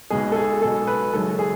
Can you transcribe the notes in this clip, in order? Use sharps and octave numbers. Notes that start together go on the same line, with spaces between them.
B1 B2 G#3 G#4
A4
G#4
B1 B2 G#3 A4
B4
F#1 F#2 D#3 G#3 A4
G#4